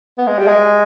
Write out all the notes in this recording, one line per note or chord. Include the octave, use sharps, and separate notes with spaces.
B3
G#3
G3
G#3